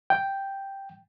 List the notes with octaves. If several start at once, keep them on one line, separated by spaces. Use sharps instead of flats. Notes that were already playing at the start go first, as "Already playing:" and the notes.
G5